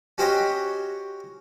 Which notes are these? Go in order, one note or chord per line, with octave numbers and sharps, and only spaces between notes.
C#4 F#4 G4 C5 C#5 D#5